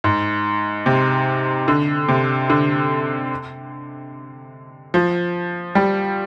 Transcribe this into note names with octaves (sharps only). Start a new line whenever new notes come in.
G#2
C3
D3
C3
D3
F3
G3